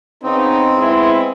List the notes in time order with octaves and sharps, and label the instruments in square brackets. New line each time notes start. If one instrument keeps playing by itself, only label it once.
[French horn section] C#3 B3 D#4 [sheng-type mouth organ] C4
[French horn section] G#3 B3 E4